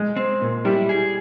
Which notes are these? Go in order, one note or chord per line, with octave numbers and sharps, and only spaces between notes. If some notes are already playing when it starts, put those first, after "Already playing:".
Already playing: G#3
C4
A#2
G3 E4
G#4